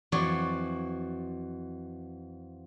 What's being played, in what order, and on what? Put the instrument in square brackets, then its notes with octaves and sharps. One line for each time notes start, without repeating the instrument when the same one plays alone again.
[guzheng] F2 E3 F#3 C#5 D5 C6